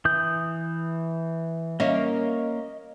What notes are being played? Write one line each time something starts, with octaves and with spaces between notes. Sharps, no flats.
E3 D#6 G6
A#3 C#4 D#5 E5